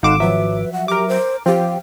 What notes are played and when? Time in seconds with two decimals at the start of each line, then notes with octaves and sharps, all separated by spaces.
0.03 G#1 D#4 A4 F5 F#5 C6 D6 E7
0.20 F3 F#3 B4 E5
0.73 F#5
0.88 G4 A#4 D6
1.08 C5
1.46 F3 C4 G4 F5